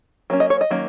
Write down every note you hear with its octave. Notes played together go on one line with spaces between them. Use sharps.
F#3 A#3 C#4
D#5
C#5
D#5
D#3 F#3 A#3 C#4